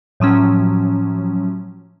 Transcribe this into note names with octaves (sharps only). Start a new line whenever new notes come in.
A2 F3 F#3 C#4